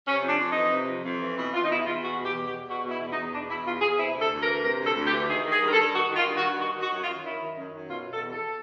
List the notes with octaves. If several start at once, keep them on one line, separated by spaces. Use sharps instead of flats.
C3 C#4
F2 D4
F2
D#4
E3
C3
F2
F2
E3
B2 E4
B2 F4
D#4
E2 E4
E2 F4
B2 F#4
B2
G4
E2
G4
E2
B2 F#4
B2
E4
E2
D#4
E2
B2 D4
B2 E4
E2 F4
E2 G#4
C3 E4
D2
A4
D2
A#4
E3
C3 A#4
D2 A4
D2
G4
E3
D#3 G#4
D#3 G#4
G2
A#4
A4
G2
D#3 F#4
D#3
F4
G2
F#4
G2
D#3 F#4
D#3
F#4
F#2
F4
F#2
D#3 E4
D#3
F#2
F#2
B2 F4
B2 A4
E2
A4